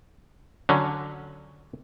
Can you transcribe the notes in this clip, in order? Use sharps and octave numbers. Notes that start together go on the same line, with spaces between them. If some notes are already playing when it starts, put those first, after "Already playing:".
D3 F#3 C#4